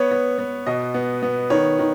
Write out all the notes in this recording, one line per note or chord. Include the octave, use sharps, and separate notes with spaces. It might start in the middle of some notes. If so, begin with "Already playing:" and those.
Already playing: B3 C#5
B3
B3
B2 D#5
B3
B3
D#3 C#5
D#3